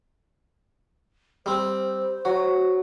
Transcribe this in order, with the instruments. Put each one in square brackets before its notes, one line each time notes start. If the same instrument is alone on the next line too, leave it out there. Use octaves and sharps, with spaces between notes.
[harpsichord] G3 C4 [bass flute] C5
[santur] F#3 [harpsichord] F#4